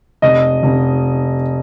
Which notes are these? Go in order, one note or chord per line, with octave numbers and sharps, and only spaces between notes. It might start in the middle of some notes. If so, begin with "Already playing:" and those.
F1 D#5
F1